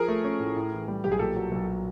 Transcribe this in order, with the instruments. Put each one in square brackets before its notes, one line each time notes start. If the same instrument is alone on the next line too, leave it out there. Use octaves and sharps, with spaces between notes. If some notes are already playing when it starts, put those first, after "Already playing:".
Already playing: [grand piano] F3 [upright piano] G#4 A#4
[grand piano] A3
C#4
A2
A2
E3
G3
[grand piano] B1 [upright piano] G4
[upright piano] G#4
[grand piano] A#2 [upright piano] G4 A4
[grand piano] F#3
B1